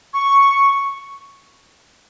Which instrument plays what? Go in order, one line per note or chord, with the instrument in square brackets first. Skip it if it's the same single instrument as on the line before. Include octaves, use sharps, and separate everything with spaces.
[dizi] C#6